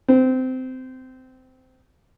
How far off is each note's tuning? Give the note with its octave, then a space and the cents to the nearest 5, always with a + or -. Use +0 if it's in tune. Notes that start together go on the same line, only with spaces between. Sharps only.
C4 -20